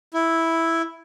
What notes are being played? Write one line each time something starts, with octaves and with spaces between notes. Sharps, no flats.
E4